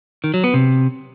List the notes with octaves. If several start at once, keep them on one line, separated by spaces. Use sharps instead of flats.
D#3
F#3
B3
C3